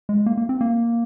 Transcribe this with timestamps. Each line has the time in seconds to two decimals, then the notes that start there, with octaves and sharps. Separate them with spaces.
0.09 G#3
0.26 A#3
0.37 A#3
0.49 C4
0.61 A#3